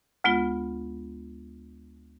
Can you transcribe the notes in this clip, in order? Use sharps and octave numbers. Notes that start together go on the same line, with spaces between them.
D2 G#3 B3 F4